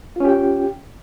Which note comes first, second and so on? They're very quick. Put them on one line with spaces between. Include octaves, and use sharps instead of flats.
F4 C#4 G4 G5